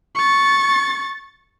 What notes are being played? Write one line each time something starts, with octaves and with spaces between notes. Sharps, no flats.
C#6 A6